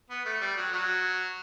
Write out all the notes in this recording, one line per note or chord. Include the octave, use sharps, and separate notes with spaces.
B3
A3
G3
F#3
F#3